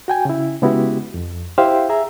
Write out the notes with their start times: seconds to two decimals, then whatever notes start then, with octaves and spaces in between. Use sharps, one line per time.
0.08 F#4 G5 G#5
0.25 C#3 E4
0.62 C#3 G#3 B3 E4 F#4 G4
1.14 F2
1.58 E4 G4 C5 E5 F5 G5
1.89 G#4 E5 A#5